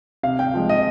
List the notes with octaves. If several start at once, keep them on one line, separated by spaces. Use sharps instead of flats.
C3 F5
G5
F3 G#3
D#5